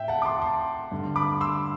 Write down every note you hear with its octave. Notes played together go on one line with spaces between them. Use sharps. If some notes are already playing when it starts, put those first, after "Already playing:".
Already playing: A2 E5 G5
F#5 A5
D6
A5 C6
A5 C6
G2 D3
B5 D6
C6 E6